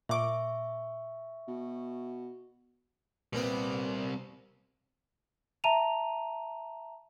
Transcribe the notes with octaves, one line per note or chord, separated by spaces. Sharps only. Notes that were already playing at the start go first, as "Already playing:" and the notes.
A#2 E5 C#6 D6
B2
A#2 G3 B3 C4
E5 A5 A#5 D#7 F7